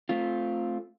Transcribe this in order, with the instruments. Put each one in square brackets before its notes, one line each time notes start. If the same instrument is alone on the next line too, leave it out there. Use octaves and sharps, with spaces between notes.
[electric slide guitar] A3 C4 F4